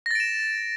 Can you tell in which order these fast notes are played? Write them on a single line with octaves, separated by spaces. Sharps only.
A#6 A6 D7 E7